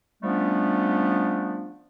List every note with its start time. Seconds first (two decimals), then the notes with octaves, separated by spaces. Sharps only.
0.23 F3 G3 A3 B3 C#4 D4